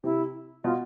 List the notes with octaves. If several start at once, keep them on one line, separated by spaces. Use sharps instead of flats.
C3 E4
B2 F4